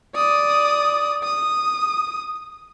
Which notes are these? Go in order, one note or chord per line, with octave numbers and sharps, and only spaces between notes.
D5 D#6
D#6